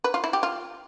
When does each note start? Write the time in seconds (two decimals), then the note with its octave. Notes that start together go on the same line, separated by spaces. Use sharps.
0.04 B4
0.14 F4
0.24 E4
0.33 G4
0.43 F4